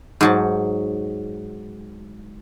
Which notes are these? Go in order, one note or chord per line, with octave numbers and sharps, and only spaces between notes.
G#2 F#3 A5